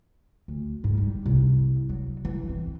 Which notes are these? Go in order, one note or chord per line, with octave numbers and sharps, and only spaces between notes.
D2
G#2
G3
C2
F#3
E3
C4